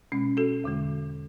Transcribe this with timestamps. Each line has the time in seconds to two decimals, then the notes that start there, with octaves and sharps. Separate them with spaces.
0.12 B2 G#3 C#4
0.37 F#4 A4
0.64 E2 D3 G#3